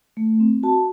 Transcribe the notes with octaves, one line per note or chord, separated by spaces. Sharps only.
A3
C4
F#4 A5